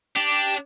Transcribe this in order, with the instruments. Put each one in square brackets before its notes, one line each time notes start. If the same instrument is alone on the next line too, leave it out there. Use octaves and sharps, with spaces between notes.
[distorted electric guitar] D4 [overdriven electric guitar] G4